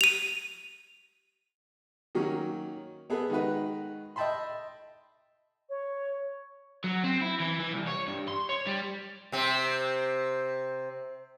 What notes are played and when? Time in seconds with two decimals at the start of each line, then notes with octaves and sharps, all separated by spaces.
0.01 D#7 F7
2.15 D#3 F#3 A#3 C#4 A#4
3.10 B3 G#4 A4 B4
3.30 D#3 G#3 D#4 F#4 B4
4.16 D#5 E5 G5 A5 B5 C6
5.69 C#5
6.84 F#3
7.04 C4
7.21 E4
7.40 E3
7.60 E3
7.73 C2
7.87 C#5
8.08 G2
8.28 C6
8.49 C#5
8.67 G3
9.32 C3 C4